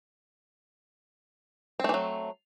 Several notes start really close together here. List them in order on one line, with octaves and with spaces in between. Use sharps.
C4 A3 E3 F#3